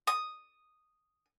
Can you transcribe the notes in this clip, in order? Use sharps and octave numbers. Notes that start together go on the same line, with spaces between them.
D#6